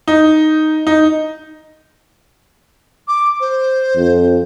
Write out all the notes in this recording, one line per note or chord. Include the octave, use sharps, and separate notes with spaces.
D#4
D#4
D6
C5
F2